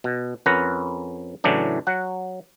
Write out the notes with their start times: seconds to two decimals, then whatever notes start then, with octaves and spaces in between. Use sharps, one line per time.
0.04 B2
0.46 F2 C#4 A#4 B4 F#5 A#5
1.44 A2 C#3 E3 F#3 D4
1.87 F#3 F#5